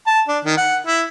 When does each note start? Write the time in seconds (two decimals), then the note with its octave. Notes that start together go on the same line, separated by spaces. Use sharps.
0.07 A5
0.28 D4
0.45 D#3
0.57 F#5
0.87 E4